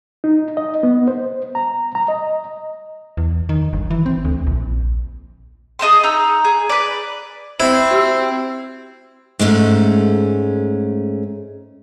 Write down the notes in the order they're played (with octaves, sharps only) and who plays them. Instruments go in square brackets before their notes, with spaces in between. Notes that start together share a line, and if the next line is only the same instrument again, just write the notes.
[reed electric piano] D#4
D#5
B3
C5
A#5
A#5
D#5
[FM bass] E2
D#3
G1
E3
C4
D2
A#1
[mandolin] G#4 D#5 A5 C6
D#4 A#5 E6
G#4
B4 D5
[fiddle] C4 [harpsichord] E4 [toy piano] C5
[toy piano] F#4 G4 E6
[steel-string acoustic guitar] G#2 G#3 A3 C#4